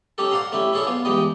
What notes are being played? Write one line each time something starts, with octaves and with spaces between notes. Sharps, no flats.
C#4 D#4 G4 A4
C5 D5 F5 F#5 A#5 C6
A3 C#4 E4 G4
C#4 E4 G#4 A4 C#5 D5
B3 F4 C5
E2 G2 G#3 D#4 G4 D#5